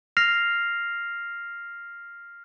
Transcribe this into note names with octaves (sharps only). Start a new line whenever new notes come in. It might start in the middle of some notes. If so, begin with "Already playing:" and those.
F6 A#6 C7 F7